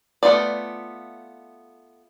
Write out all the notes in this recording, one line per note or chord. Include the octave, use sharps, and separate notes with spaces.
A3 B3 D4 F4 D5